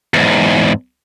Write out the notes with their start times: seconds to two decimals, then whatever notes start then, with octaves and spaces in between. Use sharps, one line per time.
0.14 E2 G#2